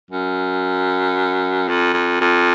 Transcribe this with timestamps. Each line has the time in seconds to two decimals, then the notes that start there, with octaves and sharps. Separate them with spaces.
0.11 F#2
1.69 F2
1.94 F2
2.21 F2